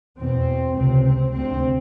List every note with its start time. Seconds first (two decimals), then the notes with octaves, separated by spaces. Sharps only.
0.19 E2 B2 C4
0.76 C#2 C3 C4
1.04 C4
1.32 D2 C3 C4